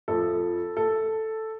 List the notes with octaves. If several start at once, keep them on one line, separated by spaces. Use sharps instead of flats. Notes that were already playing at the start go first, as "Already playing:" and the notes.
F2 F3 A4
A4